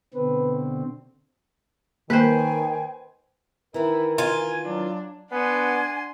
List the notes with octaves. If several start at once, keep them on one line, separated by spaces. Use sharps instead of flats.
B2 D3 C4 B4
D#3 A#3 B4 C5 G5 G#5
D#3 E3 E4 A#4
F4 G#5
F#3 D4
B3 D4 F#5 G#5 C6